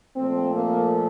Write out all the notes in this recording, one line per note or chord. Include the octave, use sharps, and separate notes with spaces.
A#2 F3 A3 C4
A#3